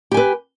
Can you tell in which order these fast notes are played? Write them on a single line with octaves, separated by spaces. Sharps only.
G4 G#5 B4